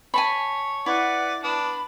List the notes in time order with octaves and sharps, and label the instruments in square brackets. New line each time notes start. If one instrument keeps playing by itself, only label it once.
[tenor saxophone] C#5 [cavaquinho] G#5 A5 B5
[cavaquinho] E4 [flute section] B4 F#5 [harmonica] D5
[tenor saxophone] B3 [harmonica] D4 [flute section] B5